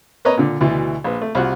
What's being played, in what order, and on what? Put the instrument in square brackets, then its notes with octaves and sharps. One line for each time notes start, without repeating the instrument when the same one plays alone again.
[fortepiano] A#3 B4 C#5 D#5 A#5
A#2 D3
D2 B2 E3
A#1 B4
A3
C2 F4 F#4 F#6